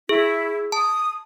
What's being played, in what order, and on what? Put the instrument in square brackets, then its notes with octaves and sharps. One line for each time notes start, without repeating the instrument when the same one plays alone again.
[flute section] E4 [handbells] G#4
[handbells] A5 [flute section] D#6